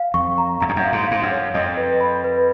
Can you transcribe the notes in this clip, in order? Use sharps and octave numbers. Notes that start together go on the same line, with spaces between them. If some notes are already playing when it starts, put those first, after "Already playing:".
Already playing: F5
F2 C#6
A#5
F#2 A#5
F2
F#2
F5
G#2
G#2 F5
F#2
C#5
F2 D#5
B4
B5
B4